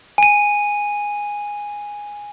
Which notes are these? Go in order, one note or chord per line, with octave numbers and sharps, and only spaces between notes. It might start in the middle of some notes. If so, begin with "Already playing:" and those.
G#5 D#7